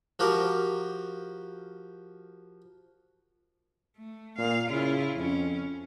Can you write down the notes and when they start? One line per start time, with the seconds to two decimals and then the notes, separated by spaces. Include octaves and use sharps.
0.19 F3 F#4 G4 A#4
3.97 A3
4.38 A#2 F5
4.70 C#3 E4 F4
5.16 F2 C#4